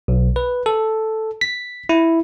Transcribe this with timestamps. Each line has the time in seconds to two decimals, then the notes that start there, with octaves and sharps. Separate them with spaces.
0.08 B1
0.36 B4
0.66 A4
1.41 B6
1.89 E4